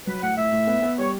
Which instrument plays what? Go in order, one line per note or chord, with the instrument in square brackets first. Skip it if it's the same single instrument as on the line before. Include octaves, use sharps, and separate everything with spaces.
[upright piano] F#3 [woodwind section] B4
[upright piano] A2 [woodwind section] F#5
[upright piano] A2 [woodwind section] E5
[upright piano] A2
B3
B3
[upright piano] G3 [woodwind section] C#5